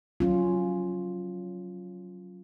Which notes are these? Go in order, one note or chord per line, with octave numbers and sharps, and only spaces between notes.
F#3 C#4 F4